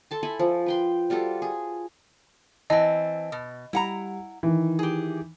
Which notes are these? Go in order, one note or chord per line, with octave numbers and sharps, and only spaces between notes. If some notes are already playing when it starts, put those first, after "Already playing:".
A4 A5 C6
E4 A4 G#5 B5
F3
B4 G5 C6
G3 F4 F#4 A4
G#4
E3 C4 D#5 A5
B2
G3 E4 F#5 A#5
D#3 E3
G4 G#4